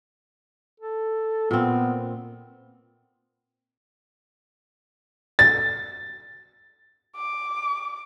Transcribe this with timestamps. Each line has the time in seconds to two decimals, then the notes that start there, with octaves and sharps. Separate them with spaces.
0.80 A4
1.51 A#2 B3 C4
5.39 A6
7.17 D6